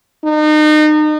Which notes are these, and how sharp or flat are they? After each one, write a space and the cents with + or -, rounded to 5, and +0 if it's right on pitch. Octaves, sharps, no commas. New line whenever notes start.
D#4 -35